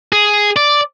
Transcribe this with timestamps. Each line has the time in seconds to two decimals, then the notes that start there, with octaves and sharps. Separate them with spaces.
0.13 G#4
0.56 D5